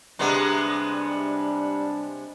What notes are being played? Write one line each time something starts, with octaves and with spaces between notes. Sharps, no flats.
C3 G3 G#3 B3 D4